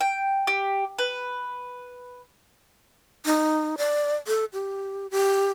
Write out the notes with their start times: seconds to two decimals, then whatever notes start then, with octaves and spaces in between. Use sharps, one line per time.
0.01 G5
0.47 G4
0.99 B4
3.25 D#4
3.78 D5
4.27 A4
4.53 G4
5.11 G4